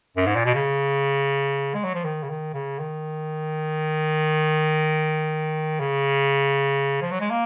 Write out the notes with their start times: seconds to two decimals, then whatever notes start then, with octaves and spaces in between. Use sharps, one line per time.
0.16 F#2
0.26 G#2
0.35 A#2
0.45 B2
0.54 C#3
1.74 G#3
1.84 F#3
1.94 F3
2.04 D#3
2.23 C#3
2.30 D#3
2.54 C#3
2.79 D#3
5.80 C#3
7.02 F3
7.12 F#3
7.21 G#3
7.30 A#3